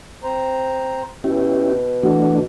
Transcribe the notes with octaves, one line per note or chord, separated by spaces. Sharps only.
C4 C5 A#5
B2 C#4 E4 G4
E3 A3 D4 F#4